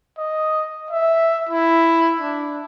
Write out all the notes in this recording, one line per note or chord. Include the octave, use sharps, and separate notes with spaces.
D#5
E5
E4
D4